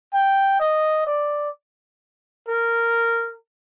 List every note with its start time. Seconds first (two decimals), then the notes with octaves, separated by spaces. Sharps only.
0.13 G5
0.60 D#5
1.06 D5
2.48 A#4